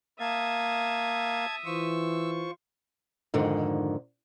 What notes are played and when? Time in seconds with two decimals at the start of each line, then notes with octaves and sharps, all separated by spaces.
0.20 A#3 E5 F5 A5 D#6 G#6
1.66 E3 F4 C5 C#6 E6
3.34 F2 G#2 D3 D#3